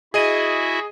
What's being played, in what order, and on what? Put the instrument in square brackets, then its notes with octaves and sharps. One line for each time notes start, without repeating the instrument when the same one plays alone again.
[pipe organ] E4 F#4 E5 [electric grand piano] G#4 D#5 D#7